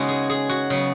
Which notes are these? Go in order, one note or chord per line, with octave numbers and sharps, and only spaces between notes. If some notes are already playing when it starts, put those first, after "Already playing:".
Already playing: C#3 G#3 B3 C#4 D#4 F#4
G#4
G#4
F#4
C#3 F#3 B3